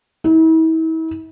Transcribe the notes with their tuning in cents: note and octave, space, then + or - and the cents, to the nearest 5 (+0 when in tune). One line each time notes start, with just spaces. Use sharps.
E4 -40